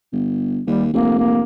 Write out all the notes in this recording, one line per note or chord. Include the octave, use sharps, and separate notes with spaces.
G1
D#2 G3
F1 A#3
A#3